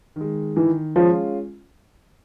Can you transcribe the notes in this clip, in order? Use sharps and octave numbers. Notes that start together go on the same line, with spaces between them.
D#3 G#3
D#3 E3
F3 G#3 C#4 F4